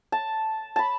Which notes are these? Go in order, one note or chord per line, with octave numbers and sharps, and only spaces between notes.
A5
A5 B5